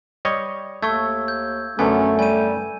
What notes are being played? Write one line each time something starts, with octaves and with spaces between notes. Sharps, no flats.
G3 C#5 D#5
D#2 A3 C#6 E6 G#6
G6
F#2 D3 A3 B3 C#4 G#5
G3 G#5 D#7